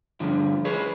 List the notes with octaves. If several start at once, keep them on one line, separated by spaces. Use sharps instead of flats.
G2 D3 F3
G#4 B4 C#5